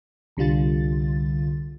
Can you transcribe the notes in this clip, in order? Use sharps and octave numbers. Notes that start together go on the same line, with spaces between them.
C2 D3 G3 F4 A6